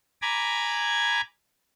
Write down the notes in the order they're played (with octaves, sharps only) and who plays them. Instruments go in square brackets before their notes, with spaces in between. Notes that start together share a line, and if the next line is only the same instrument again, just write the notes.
[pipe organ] G#5 A#5 B5 D6 G#6